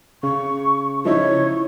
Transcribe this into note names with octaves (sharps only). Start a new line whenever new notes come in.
C#3 C#6
F3 D#4 E4 C#5